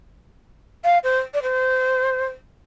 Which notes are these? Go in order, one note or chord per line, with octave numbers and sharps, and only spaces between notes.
F5
C5
D5
C5